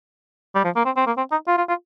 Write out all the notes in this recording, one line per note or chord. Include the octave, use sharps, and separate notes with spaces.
G3
F3
A#3
C4
C4
A#3
C4
D#4
F4
F4
F4